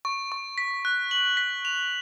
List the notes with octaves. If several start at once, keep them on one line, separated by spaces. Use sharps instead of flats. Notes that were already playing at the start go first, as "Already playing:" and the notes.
C#6
C#6
B6
F#6
F#7
B6
F7